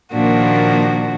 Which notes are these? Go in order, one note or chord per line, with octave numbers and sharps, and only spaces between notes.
A#2 D#3 F3 A#3 D4 F#4